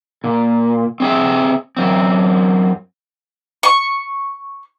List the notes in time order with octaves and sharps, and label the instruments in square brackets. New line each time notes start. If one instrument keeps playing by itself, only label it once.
[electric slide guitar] A#2
C4 G#4 E5
F#2 C4
[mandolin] C#6